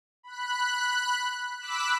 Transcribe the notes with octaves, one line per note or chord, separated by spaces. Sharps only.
B5 F#6
B5 D6 E6 F#6 B6